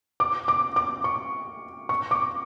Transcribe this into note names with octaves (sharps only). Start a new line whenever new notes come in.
D6
D6
D6
C#6
C#6
D6